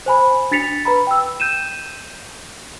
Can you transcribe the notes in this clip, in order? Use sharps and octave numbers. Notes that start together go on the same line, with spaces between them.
C5 G#5 B5
D4 A6 B6 C#7 F7
B4 A#5 B5
G5 E6
G6 D#7 E7